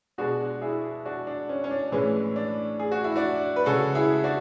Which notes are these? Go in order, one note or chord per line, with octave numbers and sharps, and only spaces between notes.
B2 G#3 D4 F#4
E4 G#4
D4 F#4
D4
C#4
C#4
D4
A2 E3 G#3 C#4
D4
G#4
F#4
E4
D4 F#4
B4
C#3 G#3 F#4 A4
E4 G#4
D4 F#4